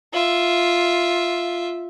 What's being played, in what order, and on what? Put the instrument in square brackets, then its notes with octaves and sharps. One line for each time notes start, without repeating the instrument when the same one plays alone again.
[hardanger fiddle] F4 E5